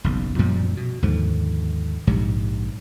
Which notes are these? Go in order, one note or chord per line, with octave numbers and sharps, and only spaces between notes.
F#1 B1 E2
F#2 A#2 F3 G3
B2
D#2 G#2 D3 F3
A#1 G#2 C3 F#3